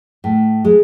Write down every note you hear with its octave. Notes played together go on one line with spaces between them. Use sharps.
A2
G#3